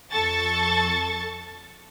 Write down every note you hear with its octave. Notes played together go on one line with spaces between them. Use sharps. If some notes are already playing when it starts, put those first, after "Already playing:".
F2 A4 A5 C#6 A6